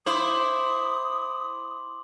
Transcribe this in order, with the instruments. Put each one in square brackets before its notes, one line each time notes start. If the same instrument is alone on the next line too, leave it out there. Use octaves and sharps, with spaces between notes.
[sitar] E4 C5 [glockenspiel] C6 D6 F#7 [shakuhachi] D#6